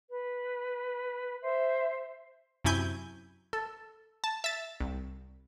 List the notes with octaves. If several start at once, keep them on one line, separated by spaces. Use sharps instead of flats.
B4
C5 E5
F#2 C3 E4 G#5 G6
A4
A5
E5 A6
C2